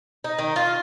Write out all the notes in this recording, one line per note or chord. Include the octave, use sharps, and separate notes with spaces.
D#4
D#3
F4